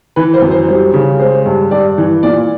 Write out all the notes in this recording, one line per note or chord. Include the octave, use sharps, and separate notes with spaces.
E3 B4
C5
F#2
C5
G3 C5
C#3
G#3 C5
G2
G2 D5
E3
A#2 D5